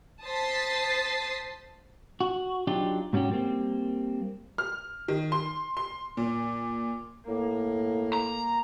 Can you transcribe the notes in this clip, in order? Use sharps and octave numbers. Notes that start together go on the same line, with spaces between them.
C5 A5 D#6 A6 B6 C7
F#4
F#3 D4 D#4 F4 G4
G#2 G3 C#4 F#4 G4
G3 A#3 C4
F6
D#3
C6
C6
A#2
A2 A#3
A#5